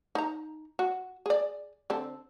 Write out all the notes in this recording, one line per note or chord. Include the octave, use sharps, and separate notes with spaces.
D#4 A#5
F#4
G#4 D5
D3 C4 A4